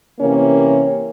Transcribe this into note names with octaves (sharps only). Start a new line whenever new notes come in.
C3 E3 A#3 C#4